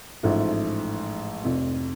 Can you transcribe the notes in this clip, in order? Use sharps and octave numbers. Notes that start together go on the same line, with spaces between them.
A1 G#2 F3 A3
F1 F2 C3